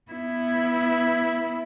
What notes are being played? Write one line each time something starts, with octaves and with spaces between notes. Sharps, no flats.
B3 E4